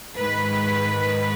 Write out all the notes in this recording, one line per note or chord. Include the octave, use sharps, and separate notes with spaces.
G#2 D#3 G#3 B4